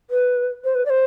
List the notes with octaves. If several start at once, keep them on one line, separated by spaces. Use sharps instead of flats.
B4
C5
B4
D5
C5